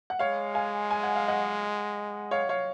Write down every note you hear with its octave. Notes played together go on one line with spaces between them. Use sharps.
F#5
G#3 C#5 F5
F5 G#5
G#5
F#5
F5
D#5 F#5
C#5 F5
C#5 F5